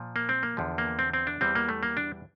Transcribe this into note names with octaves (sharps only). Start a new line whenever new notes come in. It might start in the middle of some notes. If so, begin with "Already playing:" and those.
Already playing: A#2 F3
A#3
C4
A#3
E2 D3 F3
A#3
C4
C4
D4
E2 E3 G3 C4
A#3
A3
A#3
D4